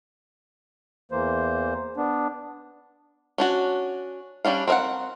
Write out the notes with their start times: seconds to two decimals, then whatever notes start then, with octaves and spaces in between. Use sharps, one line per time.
1.12 E2 E3 A#3 C5
1.97 B3 D4
3.38 C#4 D4 F#4
4.45 G3 C#4 D4 F5
4.68 C4 A#4 D#5 F5 F#5